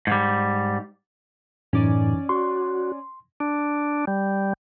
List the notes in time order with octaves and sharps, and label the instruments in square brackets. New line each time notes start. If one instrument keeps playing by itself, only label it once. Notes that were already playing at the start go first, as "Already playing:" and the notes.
[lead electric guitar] G#2 G3
[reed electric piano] F#2 E3 D#4 [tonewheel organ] A2 [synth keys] C#4 D5 G#5
[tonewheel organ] F#4 [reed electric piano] C6
[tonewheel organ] D4
G3